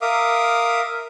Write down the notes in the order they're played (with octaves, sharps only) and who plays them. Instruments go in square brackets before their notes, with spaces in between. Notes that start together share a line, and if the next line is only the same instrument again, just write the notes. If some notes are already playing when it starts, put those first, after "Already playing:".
[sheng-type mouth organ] A#4 E5 F5 D6 D#6